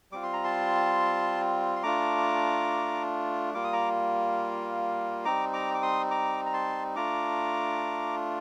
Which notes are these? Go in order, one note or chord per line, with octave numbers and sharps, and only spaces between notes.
G3 C4 F4 D6
C6
A#5
A5 C6
C6
A3 D4 F4 A#5 D6
G3 A#3 F4 D6
D#6
A#5 D6
G3 C4 D#4 A#5 D6
A#5 D6
D6
C6 D#6
A#5 D6
A#5
A5 C6
A3 D4 F4 A#5 D6